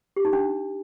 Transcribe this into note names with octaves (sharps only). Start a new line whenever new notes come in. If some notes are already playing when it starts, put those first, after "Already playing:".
G4
D#4
D4